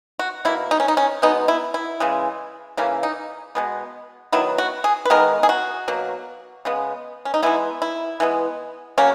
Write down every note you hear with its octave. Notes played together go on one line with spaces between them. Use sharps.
F#4
B2 A#3 E4
D#4
C#4
D#4
C#4
B2 G#3 B3 D#4
E4
E4
C#3 E3 G#3
C#3 E3 A#3 C#4
D#4
B2 G#3 B3
D#3 F#3 B3 E4
F#4
G#4
B4
D#3 G#3 B3 A#4
G#4
F#4
B2 F#3 A#3
C#3 G#3 B3
C#4
D#4
E3 G#3 B3 E4
E4
E3 G#3 B3
C#3 F#3 A#3 C#4